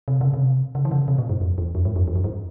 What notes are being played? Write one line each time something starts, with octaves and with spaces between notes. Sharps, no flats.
C3
C#3
C3
C#3
E3
C#3
C3
A#2
G2
F2
E2
F2
G#2
F2
E2
F2
G2